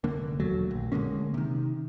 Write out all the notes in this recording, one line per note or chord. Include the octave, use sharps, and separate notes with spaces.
F1 D3 A#3
E1 D#2 F#3 A3
A#1
D3 G#3 A#3 C#4
C3 D#3